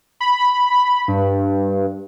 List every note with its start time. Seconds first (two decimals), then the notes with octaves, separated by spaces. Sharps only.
0.20 B5
1.08 G2